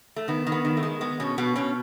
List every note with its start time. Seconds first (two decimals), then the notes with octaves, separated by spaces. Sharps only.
0.16 A3
0.28 D#3 B3
0.47 D#3
0.52 B3
0.65 D#3
0.77 A3
0.83 G#3
1.01 G#3 B3
1.20 B2 C#4
1.38 B2 B3
1.56 B2 C#4